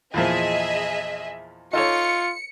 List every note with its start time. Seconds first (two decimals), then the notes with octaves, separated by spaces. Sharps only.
0.14 E2 A#2 F3 G#4 D#5 E5
1.73 D#4 F4 A4 C#5 C#7